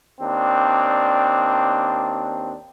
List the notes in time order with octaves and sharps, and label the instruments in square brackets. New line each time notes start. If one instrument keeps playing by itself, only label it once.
[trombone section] D#2 C4 D4